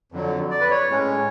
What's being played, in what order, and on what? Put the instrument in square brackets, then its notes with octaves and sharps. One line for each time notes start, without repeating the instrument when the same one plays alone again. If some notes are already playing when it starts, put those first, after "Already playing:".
[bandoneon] F2 D3 F#3
D5
B4
C#5
A2 G#3 C#4